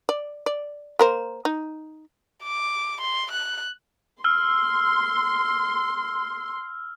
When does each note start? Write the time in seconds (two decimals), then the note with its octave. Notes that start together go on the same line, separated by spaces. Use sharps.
0.09 D5
0.46 D5
0.99 A#3 A#4 C5
1.45 D#4
2.44 D6
3.01 C6
3.31 F#6
4.24 C6 E6 F6